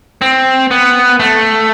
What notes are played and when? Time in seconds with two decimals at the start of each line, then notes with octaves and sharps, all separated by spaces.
0.21 C4
0.71 B3
1.20 A3